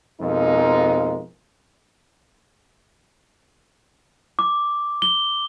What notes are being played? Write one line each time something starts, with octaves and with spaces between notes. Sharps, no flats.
F2 B2 F3 G#3 A#3 D#4
D6
G7